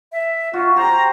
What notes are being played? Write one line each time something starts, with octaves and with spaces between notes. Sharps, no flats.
E5
F4 F#4
G4 C5 A#5